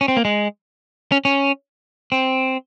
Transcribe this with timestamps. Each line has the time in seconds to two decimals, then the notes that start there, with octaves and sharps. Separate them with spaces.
0.01 C#4
0.08 C4
0.17 A#3
0.25 G#3
1.12 C#4
1.25 C#4
2.12 C4